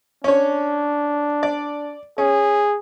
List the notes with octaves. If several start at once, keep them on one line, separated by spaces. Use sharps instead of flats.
C#4 D4 C#5
D5
C#4 G#4